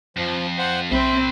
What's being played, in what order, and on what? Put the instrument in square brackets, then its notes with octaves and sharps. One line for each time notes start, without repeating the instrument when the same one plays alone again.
[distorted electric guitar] F2 [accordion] F3
[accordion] C5 F#5
[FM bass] B1 [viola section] C4 [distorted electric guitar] C5 B5 [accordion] E5